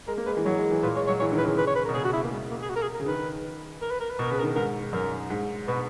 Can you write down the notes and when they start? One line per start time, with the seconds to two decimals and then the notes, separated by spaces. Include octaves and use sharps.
0.08 G#3 A#4
0.18 A#3
0.26 G#3 B4
0.37 E3
0.45 F#3 C#5
0.58 G#3
0.71 E3
0.83 A#2 B4
0.95 G#3 C#5
1.07 F#3 C#5
1.20 E3 C#5
1.32 D#3
1.38 B4
1.44 C#3
1.58 B4
1.67 C#5
1.76 B4
1.85 A#4
1.89 B2
1.94 C#3 G#4
2.05 F#4
2.13 E4
2.23 A#3
2.32 G#3
2.50 A#3
2.61 G#4
2.70 F#4
2.76 A#4
2.82 G#4
2.95 A#4
3.00 C#3
3.06 D#3 B4
3.82 A#4
3.91 B4
4.00 A#4
4.10 B4
4.19 B2 A#4
4.30 C#3 B4
4.40 A#4
4.43 D#3
4.55 G#2 A#4
4.93 F#2 A#4
5.30 G#2
5.68 B2 B4